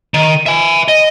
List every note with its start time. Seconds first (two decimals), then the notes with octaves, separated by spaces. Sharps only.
0.14 D#3
0.46 E5 G#5
0.88 D#5